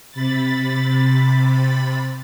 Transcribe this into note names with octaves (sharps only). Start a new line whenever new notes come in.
C3 B5 A6